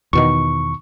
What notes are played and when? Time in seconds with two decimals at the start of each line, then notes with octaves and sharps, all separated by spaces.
0.13 E2 B2 D#3 C#6